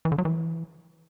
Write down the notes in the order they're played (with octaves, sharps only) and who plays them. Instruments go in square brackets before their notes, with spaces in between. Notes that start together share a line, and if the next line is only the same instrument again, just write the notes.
[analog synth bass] E3
D3
F#3
E3